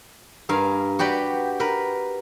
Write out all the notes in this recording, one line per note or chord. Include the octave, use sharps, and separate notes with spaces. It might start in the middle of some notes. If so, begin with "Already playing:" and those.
G2 A#4 F5 G#5
F#4 G4 B4 D5 G5
A#4 B4